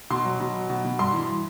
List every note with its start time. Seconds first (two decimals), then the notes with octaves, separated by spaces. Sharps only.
0.10 B2 C6
0.25 F#3
0.40 B2
0.55 F#3
0.70 B2
0.85 B2
0.99 G2 C6
1.13 E3